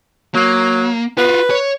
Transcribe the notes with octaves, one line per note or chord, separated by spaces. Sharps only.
F#3 A#3
F4 F#4 B4
C#5